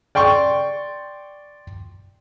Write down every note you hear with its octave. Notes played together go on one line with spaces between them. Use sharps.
D5 G5 C6 C#6